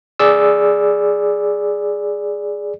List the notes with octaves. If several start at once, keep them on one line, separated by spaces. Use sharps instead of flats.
G#4 D5 E6